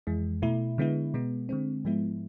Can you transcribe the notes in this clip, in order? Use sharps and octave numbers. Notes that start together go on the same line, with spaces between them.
F2 E3 G#3
B2 A3 E4
D3 G#3 B3 E4
B2 G#3 B3
D3 G#3 C4
G#2 F3 G#3 B3 E4